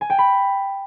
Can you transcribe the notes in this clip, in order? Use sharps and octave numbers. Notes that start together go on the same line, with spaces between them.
G#5
G5
B5